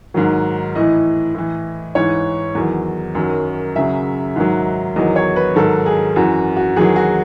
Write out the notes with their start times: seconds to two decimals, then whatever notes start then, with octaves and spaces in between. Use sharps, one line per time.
0.14 G#2 D#3 F#3
0.75 A2 E3 D#5
1.34 A2 E3
1.95 G#2 E3 C#5
2.55 E2 D#3 F#3
3.15 F#2 D#3 F#3
3.75 F#2 C#3 F#3 E5
4.36 G#2 D#3 F#3
4.96 E2 D#3 F#3 D#5
5.16 C#5
5.36 B4
5.56 G#2 D#3 F#3 A4
5.86 G#4
6.16 F#2 E3 F#4
6.57 F#4
6.76 E2 D#3 F#3 G#4
6.96 F#4